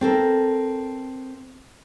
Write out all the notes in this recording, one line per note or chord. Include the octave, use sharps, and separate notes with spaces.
C4 A4 A#4